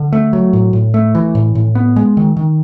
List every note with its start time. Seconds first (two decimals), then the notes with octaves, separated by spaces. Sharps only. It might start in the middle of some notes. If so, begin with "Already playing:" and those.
Already playing: D3
0.13 A3
0.33 F#3
0.53 A2
0.73 A2
0.94 A3
1.15 E3
1.35 A2
1.55 A2
1.75 B3
1.96 G#3
2.17 D#3
2.37 D#3